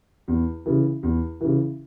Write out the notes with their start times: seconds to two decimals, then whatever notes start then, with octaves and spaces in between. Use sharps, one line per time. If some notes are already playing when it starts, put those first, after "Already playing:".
0.28 E2
0.66 C#3 E3
1.03 E2
1.41 C#3 E3